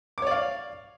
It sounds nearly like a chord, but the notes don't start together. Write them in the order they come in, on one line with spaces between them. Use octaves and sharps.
D6 C#5 D5 F5